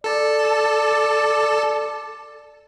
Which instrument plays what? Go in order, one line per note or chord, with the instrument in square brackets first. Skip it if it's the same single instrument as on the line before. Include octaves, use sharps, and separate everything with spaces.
[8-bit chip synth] A4 A5 [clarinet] D5